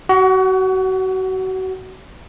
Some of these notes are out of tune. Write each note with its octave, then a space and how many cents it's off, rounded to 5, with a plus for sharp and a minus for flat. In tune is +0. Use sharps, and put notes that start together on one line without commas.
F#4 +30 F#5 +0